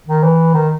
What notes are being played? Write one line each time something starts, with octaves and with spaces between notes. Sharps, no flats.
D#3
E3
D#3